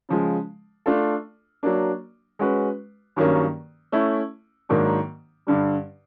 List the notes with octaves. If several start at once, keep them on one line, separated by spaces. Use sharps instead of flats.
C#3 F3 G#3
A3 D4 F4 A4
F#3 A#3 D4
G#3 C#4 F#4 B4
G2 D#3 F#3 A#3 C#4
A3 C#4 E4
G#2 D#3 F#3 A#3 D4
G2 D3 G3